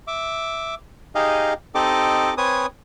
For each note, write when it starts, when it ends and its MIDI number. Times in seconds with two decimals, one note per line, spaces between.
0.07 0.75 76
0.07 0.75 86
1.15 1.53 63
1.15 1.53 67
1.15 1.53 68
1.15 1.53 75
1.15 1.53 77
1.75 2.34 60
1.75 2.34 63
1.75 2.34 67
1.75 2.34 69
1.75 2.34 75
1.75 2.34 86
2.37 2.66 60
2.37 2.66 71
2.37 2.66 73
2.37 2.66 80
2.37 2.66 87